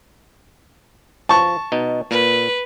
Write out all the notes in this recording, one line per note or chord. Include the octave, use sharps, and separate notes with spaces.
F3 A5 C#6
B2 D#4
A#2 B4